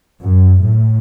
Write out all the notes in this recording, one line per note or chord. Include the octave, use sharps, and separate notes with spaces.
F#2
A2